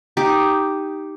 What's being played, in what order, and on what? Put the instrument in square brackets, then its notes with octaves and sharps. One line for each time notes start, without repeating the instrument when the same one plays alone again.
[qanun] D#4 G4